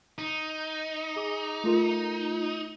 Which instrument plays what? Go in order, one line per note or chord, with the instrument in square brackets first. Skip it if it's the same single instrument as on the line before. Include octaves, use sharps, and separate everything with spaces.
[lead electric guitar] D#4
[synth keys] G#4 D6
A3 F4 A#4